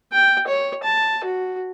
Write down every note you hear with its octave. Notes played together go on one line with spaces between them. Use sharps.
G5
C#5
A5
F#4